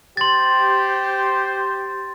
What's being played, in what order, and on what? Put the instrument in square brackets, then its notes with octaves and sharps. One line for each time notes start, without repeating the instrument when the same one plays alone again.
[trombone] G4 [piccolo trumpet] C5 [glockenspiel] C6 A6